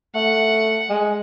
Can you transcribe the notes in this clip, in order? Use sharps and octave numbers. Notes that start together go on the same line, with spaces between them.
A3 F#5
G#3